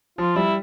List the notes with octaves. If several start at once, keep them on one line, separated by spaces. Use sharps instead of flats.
F3 F4
G3 E4